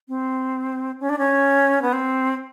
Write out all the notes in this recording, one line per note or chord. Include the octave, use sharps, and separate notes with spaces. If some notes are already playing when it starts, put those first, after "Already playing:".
C4
C#4
D4
C#4
B3
C4